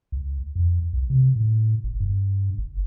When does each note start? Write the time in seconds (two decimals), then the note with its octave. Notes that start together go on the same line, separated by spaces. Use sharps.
0.12 C#2
0.55 F2
0.93 C2
1.10 C3
1.36 A2
1.84 F#1
2.00 G2
2.58 F#1